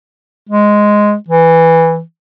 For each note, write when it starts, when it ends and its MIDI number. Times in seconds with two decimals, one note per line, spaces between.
0.49 1.14 56
1.28 2.01 52